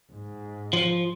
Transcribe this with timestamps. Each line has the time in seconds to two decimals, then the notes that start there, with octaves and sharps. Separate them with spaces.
0.12 G#2
0.73 F3